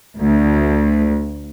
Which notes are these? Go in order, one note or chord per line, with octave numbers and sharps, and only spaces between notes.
D2